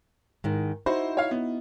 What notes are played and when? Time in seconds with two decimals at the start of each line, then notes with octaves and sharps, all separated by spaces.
0.44 G#2 D#3
0.86 D#4 E4 F#4 C5
1.17 C#5 F5
1.31 B3